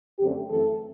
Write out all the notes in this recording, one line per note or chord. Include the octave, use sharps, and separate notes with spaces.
F#2 D3 A3 C4 G4
F#2 E3 A3 C4 A4